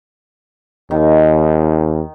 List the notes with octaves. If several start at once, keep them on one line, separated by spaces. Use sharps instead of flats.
D#2 D#3